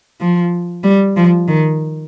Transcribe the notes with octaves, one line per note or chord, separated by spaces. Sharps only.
F3
G3
F3
D#3